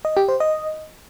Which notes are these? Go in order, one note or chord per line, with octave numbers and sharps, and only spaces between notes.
D#5
G4
C5
D#5